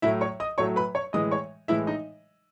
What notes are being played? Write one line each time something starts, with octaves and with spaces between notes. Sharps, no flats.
A2 F#3 A3 E4 E5
C#5 C#6
D#5 D#6
A2 F#3 A3 C#5 C#6
B4 B5
C#5 C#6
A2 E3 G#3 D#5 D#6
C#5 C#6
A2 E3 G#3 E4 E5
D#4 D#5